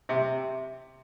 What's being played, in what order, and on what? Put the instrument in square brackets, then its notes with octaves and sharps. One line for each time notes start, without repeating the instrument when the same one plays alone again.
[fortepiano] C3